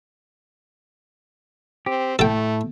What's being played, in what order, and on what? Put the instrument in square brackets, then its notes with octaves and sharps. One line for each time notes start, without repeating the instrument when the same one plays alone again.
[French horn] C4 [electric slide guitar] G4
[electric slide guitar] A2 [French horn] A3 [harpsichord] A4 G5